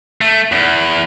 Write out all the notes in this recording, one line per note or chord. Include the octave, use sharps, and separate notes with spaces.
A3
E2